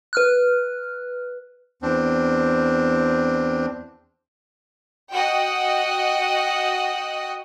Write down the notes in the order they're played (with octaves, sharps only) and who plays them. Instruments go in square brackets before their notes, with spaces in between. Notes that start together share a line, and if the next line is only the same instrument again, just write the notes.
[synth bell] B4 F6 F#6
[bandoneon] E2 C4 D4
[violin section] F#4 D#5 F#5 G5